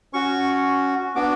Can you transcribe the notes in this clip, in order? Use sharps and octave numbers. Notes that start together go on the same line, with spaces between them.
C#4 F#4 C#6
B3 D4 F#4 D6